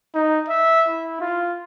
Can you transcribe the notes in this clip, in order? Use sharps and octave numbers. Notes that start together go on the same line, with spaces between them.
D#4
E5
E4
F4